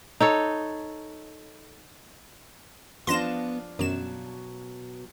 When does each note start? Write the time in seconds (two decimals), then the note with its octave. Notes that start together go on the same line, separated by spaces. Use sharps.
0.20 D#4 A4 C#5
3.07 F3 B3 D4 F4 C6 A#6 E7
3.79 F#2 B2 F#3 E7